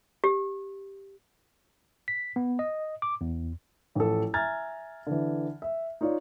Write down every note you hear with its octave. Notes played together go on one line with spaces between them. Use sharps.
G4
B6
B3
D#5
D6
E2
A1 F3 A4
E5 G#5 A#5 F6 G#6 A6
D3 E3
E5
D#4 F4 C#5 D5